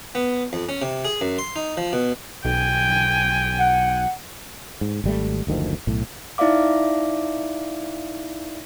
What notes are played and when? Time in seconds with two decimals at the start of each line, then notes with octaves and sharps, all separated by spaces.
0.15 B3
0.53 F2
0.69 C#4
0.82 C3
1.05 G#4
1.21 F#2
1.38 C6
1.56 D#4
1.77 F3
1.93 B2
2.45 B1 G5 G#5
3.59 F#5
4.81 G#2
5.04 G#1 G3 A3
5.47 F#1 D2 D#3 F3
5.87 B1 A2
6.38 D#4 E4 D5 E5 F5 D6